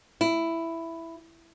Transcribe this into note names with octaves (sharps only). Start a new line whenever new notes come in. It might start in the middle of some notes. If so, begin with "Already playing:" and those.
E4